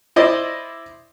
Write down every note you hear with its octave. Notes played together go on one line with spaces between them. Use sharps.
E4 C5 D5 D#5